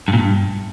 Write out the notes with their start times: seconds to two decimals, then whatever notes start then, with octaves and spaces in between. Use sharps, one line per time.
0.08 G2
0.13 A#2
0.18 G2